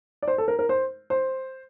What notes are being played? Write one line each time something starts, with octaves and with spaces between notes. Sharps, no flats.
D5
C5
A4
A#4
A#4
C5
C5